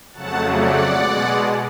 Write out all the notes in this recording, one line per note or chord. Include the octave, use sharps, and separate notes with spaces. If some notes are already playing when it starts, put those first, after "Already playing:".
F2 C#3 F#3 A3 F#5 A5
D5 F#5
B2 G#3